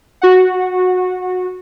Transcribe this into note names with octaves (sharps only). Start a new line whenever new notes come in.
F#4 F#5